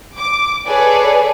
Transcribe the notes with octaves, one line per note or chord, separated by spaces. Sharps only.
D6
G#4 A4 B4 C#5 D5